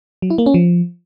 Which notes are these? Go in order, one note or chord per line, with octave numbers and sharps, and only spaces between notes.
F#3
E4
A#3
C#4
F3